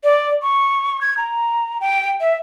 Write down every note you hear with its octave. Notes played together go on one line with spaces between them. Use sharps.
D5
C#6
G#6
A#5
G5
E5